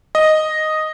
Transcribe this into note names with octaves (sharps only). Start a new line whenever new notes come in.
D#5